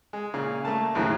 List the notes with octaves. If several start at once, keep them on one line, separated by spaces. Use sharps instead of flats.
G#3
A#2 C#3
A3 A#3 A5
A1 D#2 A2 C#3 F#3